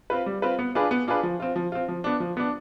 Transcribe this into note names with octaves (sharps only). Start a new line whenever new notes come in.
C4 F4 B4
G3
C4 F4 B4
B3
D4 F4 G#4 B4
B3
D4 F4 G#4 B4
F3
C4 F4
F3
C4 F4
F3
B3 D4
F3
B3 D4